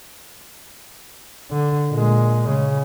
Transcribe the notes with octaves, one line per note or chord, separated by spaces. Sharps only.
D3
A#2 G#3
C#3